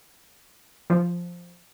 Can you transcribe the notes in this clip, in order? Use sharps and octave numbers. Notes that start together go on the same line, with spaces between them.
F3